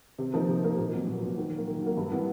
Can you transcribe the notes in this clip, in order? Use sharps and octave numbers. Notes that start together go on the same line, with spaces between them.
C3
F3 A#3 D#4
C3
F3 A#3 D#4
A#2
F#3 B3
A#2
F#3 B3
D#3
F#3
A#3
D#3
F#3 A#3
G2
E3 G3 B3